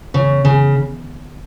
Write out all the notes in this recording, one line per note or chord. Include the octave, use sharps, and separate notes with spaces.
C#3
C#3